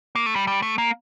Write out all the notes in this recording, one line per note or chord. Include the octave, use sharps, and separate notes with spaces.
A#3
A3
G3
G3
A3
A#3